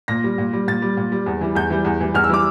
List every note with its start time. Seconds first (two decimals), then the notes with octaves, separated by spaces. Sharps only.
0.08 A#2 A#6
0.24 G3
0.38 A#2
0.53 G3
0.68 A#2 A6
0.82 G3
0.97 A#2
1.12 G3
1.26 E2
1.41 E3 G3
1.55 E2 G6
1.70 E3 G3
1.85 E2
2.00 E3 G3
2.14 E2 F6
2.24 E6
2.29 E3 G3 D6